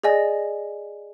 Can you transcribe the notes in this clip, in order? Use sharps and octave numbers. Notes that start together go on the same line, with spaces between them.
G#4 D5 D#5 G#5 A#6